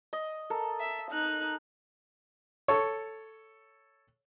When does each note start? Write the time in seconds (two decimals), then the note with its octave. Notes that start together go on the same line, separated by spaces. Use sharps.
0.13 D#5
0.50 A4 A#4
0.80 E5
1.11 D#4 F#6
2.68 A4 C#5